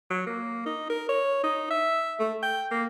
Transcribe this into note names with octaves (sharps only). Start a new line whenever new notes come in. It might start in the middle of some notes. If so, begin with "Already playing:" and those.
F#3
A#3
D#4
A#4
C#5
D#4
E5
A3
G5
A#3